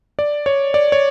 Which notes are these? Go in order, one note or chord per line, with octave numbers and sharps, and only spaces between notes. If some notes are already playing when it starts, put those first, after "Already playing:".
D5
C#5
D5
C#5